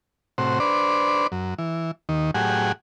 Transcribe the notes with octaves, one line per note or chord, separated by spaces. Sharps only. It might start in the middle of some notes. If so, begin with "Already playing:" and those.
A2 C3 F#4 C5
D4 B4 C5 D5
F#2
E3
D#2 D#3
A2 F#3 G4 G#4 F#5 G#5